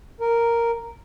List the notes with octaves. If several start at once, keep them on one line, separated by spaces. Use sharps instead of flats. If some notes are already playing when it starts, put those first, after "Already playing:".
A#4